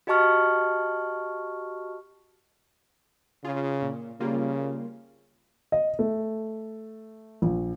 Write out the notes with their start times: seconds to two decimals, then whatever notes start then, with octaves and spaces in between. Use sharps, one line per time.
0.07 F#4 G4 D#5 A5 C#6 F6
3.44 C#3 F4 G#4
3.82 A#2
4.20 C#3 G3 A#3 F4
5.72 D#5
5.99 A3
7.42 A#1